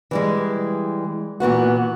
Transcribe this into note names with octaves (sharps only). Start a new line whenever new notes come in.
E3 G3 G#3
A#2 E3 B3 F#4